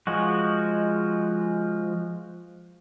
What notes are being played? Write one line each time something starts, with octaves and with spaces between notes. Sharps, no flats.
F3 G#3 F#4